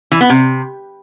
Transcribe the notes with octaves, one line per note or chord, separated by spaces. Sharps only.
E3
B3
C3